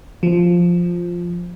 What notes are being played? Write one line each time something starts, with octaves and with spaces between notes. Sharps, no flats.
F3